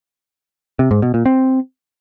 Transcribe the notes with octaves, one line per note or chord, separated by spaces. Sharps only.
C3
G#2
B2
A#2
C4